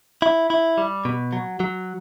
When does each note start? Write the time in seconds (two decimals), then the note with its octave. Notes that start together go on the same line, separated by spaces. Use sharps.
0.22 E4
0.50 E4
0.78 G3
1.05 B2
1.33 F#3
1.60 F#3